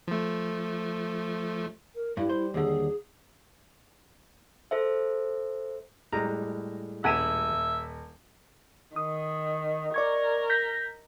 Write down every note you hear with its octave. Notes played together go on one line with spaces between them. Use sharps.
F3 A3
A#4
G2 G3 E4
C5
D#2 D3 G#4
A4 C5 E5
A2 G3 G#3 A#5
D#1 E5 F#5 G#5 D#7 E7
D#3 D#6
A#4 D5 C#6 G#6
G6 A#6 B6